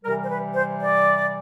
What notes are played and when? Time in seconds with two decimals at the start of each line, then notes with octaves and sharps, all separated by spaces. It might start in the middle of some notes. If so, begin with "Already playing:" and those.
0.04 C3 E3 G3 A#4
0.23 C5
0.30 B4
0.54 C5
0.81 D5